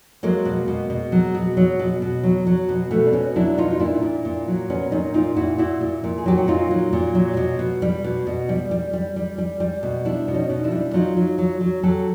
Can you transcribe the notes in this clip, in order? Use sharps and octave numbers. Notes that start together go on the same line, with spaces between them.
F#3 G#3 A#3
B2
B2
B2
F#3
B2
F#3
B2
B2
F#3
F#3
B2
B2 A3 B3
D4
B2 B3 C#4
F#3 D4 E4
B2 D#4 F4
D#4
A#2 D4 E4
A#2
A#2
F#3
A#2 B3 C#4
A#2 C#4 D#4
A#2 D#4 F4
A#2 E4 F#4
A#2 E4 F#4
A#2
A#2
G#4
F#3 G4
F#4
A#2 D#4 F4
F#3
A#2
F#3
B2
B2
G3
B2
B2
G3
G3
G3
G3
G3
G3
B2
G3 D4 E4
B2
C#4 D#4
B2
D4 E4
G3
F#3 D#4 F4
F#3
F#3
F#3
F#3 G4 A4